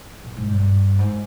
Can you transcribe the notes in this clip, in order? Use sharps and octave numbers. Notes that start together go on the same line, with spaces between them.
A#2
G#2
G2
G#2